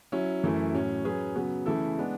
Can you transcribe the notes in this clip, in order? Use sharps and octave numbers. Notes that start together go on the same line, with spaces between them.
F#3 C#4 E4
F#2 E3 A3 E4
A2 F#3 C#4
F#3 C#4 G#4 B4
C#3 F#3 B3
C#3 E3 A3 E4 A4
G#3 B3 D4